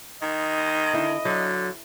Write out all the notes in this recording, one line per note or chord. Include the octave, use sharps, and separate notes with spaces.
D#3 D#5
D3 E4
D3 F#3